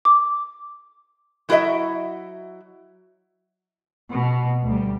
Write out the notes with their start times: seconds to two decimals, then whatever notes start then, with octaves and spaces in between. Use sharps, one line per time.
0.05 D6
1.49 F#3 E4 F#4 B4 D#5 E5
4.11 B2
4.64 D2 G3